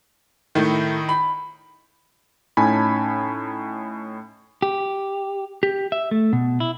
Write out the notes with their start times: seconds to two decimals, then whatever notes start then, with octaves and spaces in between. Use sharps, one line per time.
0.55 A2 D#3 A3 D#4 E4
1.09 B5
2.57 A2 C#4 D#4 G#5 A5 B5
4.62 G4
5.63 G4
5.92 E5
6.11 A3
6.33 B2
6.60 E4